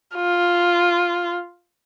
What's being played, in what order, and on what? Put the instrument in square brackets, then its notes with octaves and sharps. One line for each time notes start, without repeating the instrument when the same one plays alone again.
[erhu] F4